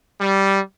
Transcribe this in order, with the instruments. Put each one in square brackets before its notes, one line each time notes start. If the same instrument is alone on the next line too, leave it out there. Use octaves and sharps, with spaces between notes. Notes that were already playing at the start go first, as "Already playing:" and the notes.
[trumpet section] G3